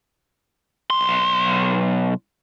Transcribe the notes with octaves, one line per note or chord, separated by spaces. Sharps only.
B1 C6